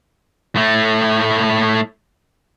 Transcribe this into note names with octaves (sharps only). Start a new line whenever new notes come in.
A2 A3